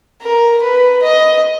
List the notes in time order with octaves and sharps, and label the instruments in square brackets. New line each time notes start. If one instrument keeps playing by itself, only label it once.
[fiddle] A#4
B4
D#5